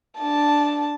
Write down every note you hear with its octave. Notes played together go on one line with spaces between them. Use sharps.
D4 A5